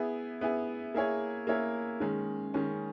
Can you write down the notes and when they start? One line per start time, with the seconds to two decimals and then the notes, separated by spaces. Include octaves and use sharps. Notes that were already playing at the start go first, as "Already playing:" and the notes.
Already playing: B3 E4 G#4
0.41 B3 E4 G#4
0.94 A#3 E4 G#4 C#5
1.47 A#3 E4 G#4 C#5
2.00 D#3 G#3 C#4
2.54 D#3 G#3 C#4